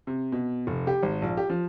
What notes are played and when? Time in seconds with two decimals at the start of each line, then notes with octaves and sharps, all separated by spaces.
0.07 C3
0.32 B2
0.67 F1
0.87 G4
1.03 G#1
1.22 A#1
1.37 G4
1.50 F3